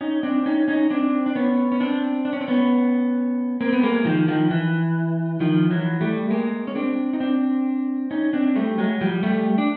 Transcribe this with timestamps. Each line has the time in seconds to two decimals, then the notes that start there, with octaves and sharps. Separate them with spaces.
0.01 C#4 D#4
0.23 C4 D4
0.46 C#4 D#4
0.68 C#4 D#4
0.90 C4 D4
1.26 D4
1.35 B3 C#4
1.72 C#4
1.80 C4 D4
2.25 D4
2.33 C#4
2.41 C4
2.48 B3 C#4
3.61 A#3 C4
3.73 B3
3.83 G#3 A#3
4.05 D#3 F3
4.28 D#3 F3
4.51 E3
5.40 D#3 F3
5.70 E3 F#3
6.01 G3 A3
6.30 G#3 A#3
6.67 C#4
6.75 C4 D4
7.13 D#4
7.20 C4 D4
8.11 C#4 D#4
8.33 C4 D4
8.55 G3 A3
8.78 F#3 G#3
9.01 F3 G3
9.23 G3 A3
9.58 D4